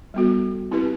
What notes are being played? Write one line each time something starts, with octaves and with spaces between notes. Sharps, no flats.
G3 B3 F#4 A4
C4 E4 G4 B4